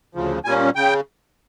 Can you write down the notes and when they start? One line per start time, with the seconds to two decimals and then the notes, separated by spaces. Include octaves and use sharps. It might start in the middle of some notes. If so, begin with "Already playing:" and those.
0.15 D2 C#3 F3
0.45 A#2 G3 A#3 C#4 G#5
0.75 C#3 G5